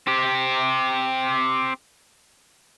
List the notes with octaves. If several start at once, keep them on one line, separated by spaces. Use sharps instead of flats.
C4 G4